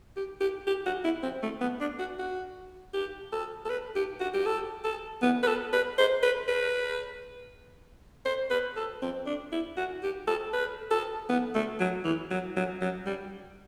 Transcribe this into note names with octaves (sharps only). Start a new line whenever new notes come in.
G4
G4
G4
F#4
E4
C4
A3
B3
D4
F#4
F#4
G4
A4
A4
B4
G4
F#4
G4
A4
A4
B3
B4
A4
B4
C5
B4
B4
C5
B4
A4
C4
D4
E4
F#4
G4
A4
B4
A4
B3
A3
F#3
E3
F#3
F#3
F#3
G3